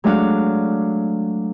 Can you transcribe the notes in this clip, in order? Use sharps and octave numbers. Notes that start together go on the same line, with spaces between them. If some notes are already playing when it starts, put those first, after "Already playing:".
F#3 G#3 A3 D4 F#4 F5